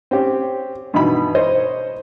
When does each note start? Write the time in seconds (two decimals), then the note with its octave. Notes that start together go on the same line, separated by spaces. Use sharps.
0.11 C4 C#4 G4
0.94 G2 B2 D#3 E3 B5
1.35 C5 C#5 D#5